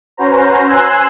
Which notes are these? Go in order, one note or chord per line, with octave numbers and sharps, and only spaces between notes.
C#4 F#4 B4 C5 A#5
G#5 C6 E6 F#6